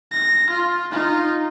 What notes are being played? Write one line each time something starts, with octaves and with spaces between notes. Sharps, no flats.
A#6
F4
D#4 F4